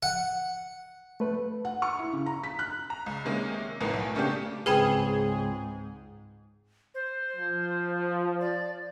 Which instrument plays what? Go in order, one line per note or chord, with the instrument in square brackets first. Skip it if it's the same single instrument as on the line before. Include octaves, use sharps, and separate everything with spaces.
[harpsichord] F#5
[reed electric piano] A3 B4
[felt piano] F#5
C#6
E4
C#3
A#5
B6
F#6
[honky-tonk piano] A#5
C#2
C3 D#3 G#3 A#3 C#4
A1 F2 A2 B3 D#4 A#4
B1 A3
C#3 A3 A#3 C#4 D4 G4
[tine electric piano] C#2 C4 [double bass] G#2 [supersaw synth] G#4 [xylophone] B4 G5 B5
[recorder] C5
[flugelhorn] F3
[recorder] D5